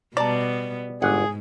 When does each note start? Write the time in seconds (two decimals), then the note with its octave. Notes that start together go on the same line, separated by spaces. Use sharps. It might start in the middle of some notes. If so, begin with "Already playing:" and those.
0.17 B2 G3 B3 D5 A5 A#5
1.02 G1 G#2 G#4 F#5